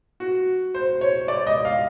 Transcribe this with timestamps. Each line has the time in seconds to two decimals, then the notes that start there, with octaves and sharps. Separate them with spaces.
0.20 F#4
0.75 C5
1.01 C#5
1.28 D5
1.47 D#5
1.65 F5